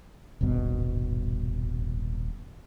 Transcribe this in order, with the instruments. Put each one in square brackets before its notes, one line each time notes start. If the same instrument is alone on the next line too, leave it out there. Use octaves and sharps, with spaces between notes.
[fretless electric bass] D#1 G#1 G2 B2